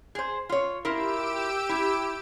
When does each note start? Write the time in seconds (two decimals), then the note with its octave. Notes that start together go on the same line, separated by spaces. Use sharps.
0.15 G#4 C5
0.49 F4 C#5
0.85 E4 F4 G4 A#4 E6 D7
1.69 E4